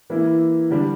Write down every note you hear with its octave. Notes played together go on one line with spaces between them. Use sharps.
E3 A#3 E4
D3 G3 D4